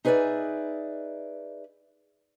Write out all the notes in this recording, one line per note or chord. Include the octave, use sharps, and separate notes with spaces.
D#4 G#4 B4 C5 D5 E5